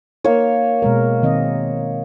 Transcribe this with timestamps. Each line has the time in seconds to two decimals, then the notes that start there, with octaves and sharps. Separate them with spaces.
0.25 A#3 D#4 C#5
0.82 B2 G#3 A#4
1.23 D#3 C4 D#5